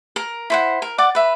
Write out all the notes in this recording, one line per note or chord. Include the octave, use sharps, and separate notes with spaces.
A#4
E4 C5 F#5
A#4
D5 F#5 D6
B4 E5